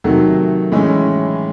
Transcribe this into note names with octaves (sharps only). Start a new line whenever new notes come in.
C3 D#3 F#3 A3
A2 E3 G#3 C#4